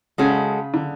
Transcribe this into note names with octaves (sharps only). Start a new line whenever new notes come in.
C#3 G#3 C#4 F#4 A4
D3